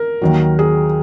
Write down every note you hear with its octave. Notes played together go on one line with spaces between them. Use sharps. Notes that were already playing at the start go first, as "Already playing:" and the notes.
Already playing: A#4
D#2 D#3 F#3
G#4